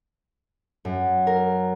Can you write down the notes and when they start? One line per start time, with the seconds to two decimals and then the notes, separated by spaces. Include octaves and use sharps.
0.85 F#2
1.27 A#4